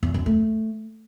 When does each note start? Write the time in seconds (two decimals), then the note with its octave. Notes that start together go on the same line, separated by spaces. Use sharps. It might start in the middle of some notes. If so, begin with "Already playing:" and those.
0.03 E2
0.14 F#2
0.26 A3